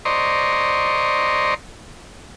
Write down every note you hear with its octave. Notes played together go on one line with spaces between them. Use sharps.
C5 D5 D#5 A#5 C6 C#6